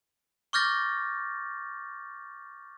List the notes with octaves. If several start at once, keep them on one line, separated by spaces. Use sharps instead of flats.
C#6 D6 F6 G6 A6 A#6